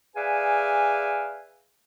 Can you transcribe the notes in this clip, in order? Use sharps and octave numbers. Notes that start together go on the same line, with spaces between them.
G#4 B4 D5 E5 F5 G#5